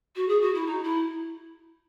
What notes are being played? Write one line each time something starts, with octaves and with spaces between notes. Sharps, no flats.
F#4
G#4
F#4
E4
D#4
E4